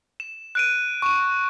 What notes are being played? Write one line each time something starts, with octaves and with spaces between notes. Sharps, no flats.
E7
F#6 D7 D#7
C#6 E7